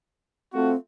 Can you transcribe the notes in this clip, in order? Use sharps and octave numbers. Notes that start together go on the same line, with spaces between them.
A3 C4 F4 F#4